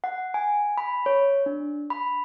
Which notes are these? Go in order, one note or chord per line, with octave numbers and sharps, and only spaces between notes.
F#5
G#5
B5
C#5
D4
B5